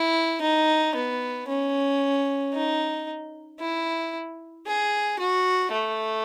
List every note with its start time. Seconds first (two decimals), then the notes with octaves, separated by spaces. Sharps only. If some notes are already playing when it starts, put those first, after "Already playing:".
Already playing: E4
0.42 D#4
0.95 B3
1.48 C#4
2.54 D#4
3.60 E4
4.67 G#4
5.20 F#4
5.72 A3